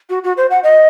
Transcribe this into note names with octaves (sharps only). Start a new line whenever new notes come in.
F#4
F#4
C5
F#5
D#5